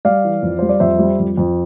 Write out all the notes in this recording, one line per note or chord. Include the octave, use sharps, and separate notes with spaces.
G3 D5 F5
E3
F2
G3 C5
D5
F2 C5 E5
G3
F2
F2